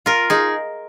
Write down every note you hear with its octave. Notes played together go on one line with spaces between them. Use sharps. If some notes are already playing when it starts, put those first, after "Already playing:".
F4 A#4
D#4 G#4